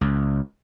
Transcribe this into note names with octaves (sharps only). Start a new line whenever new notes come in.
C#2